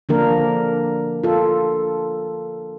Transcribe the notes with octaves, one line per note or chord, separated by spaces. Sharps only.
D3 F3 A#3 D4 A#4
F4 A4